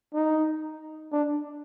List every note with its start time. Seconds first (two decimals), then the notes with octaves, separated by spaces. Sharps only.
0.14 D#4
1.13 D4